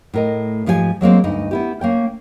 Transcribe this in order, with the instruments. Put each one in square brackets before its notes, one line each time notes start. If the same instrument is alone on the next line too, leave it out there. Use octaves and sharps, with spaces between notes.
[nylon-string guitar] A2 A#4 D#5
G#2 F3 G4 C#5 G#5
F#3 G#3 A#3 C4
D2 G2 D#4 D#5
B3 E4 G4
A#3 C#4 G5